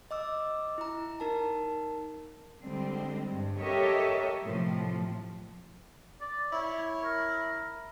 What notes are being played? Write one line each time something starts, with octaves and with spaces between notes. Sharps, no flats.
D#5 D6 E6
E4 A#5
D#4 A#4 A5
D3 G3 G#3 C4
G2
G4 A4 A#4 C#5 D#5 E5
A2 C3 F3
D5
E4 C#5
A#4